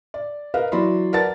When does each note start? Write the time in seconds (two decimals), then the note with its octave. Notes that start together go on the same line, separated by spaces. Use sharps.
0.14 D5
0.54 A#4 B4 D#5 F5
0.72 E3 F#3 D5 B5 C6
1.13 A#4 B4 D5 F#5 A5 A6